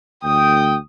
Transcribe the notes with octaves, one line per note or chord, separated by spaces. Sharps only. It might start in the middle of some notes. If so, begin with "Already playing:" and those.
D2 G5 D#6